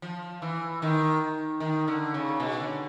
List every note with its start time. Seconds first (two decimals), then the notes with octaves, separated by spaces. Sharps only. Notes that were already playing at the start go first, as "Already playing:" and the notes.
0.02 F3
0.42 E3
0.82 D#3
1.60 D#3
1.88 D3
2.14 C#3
2.40 B2
2.60 D3